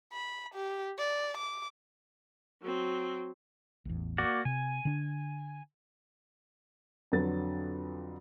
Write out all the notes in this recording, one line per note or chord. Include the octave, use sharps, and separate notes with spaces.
B5
G4
D5
D6
F#3 C4
A1 E2
A#3 F#4 D5
C3 G#5
D3 D4
F2 D3 F#3 B4 A6